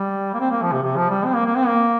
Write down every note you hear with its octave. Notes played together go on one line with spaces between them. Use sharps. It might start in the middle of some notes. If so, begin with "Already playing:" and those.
Already playing: G3
A#3
C4
A#3
F3
C3
C3
F3
G3
C4
A#3
A#3
C4
A#3